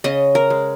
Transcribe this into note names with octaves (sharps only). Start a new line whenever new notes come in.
C#3 D#5
A#4
G#3